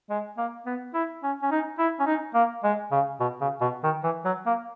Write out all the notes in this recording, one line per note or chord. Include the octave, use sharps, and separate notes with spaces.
G#3
A#3
B3
E4
C#4
C#4
D#4
E4
C#4
D#4
A#3
G#3
C#3
B2
C#3
B2
D#3
E3
F#3
A#3